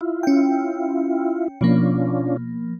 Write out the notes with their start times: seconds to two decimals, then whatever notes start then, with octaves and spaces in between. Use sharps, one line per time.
0.01 E4 F4
0.23 C#4 G5
1.61 B2 F3 A#3 C#4 D4 F4